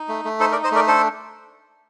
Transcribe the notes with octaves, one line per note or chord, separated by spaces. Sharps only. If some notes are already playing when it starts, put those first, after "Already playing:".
Already playing: D#4
A3
A3
D#4 A4 C5
A#4 D5
D#4
C5 D#5
A3 A#4 D5
D4 A4 C5